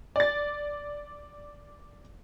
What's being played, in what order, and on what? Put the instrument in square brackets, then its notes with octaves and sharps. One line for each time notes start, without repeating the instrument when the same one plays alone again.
[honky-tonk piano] D5 A6